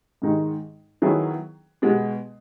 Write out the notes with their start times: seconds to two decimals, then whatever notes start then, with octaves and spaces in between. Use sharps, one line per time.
0.22 G#2 D#3 G#3 D#4 G#4
1.02 D#3 F#3 B3 E4 G#4
1.82 B2 G#3 B3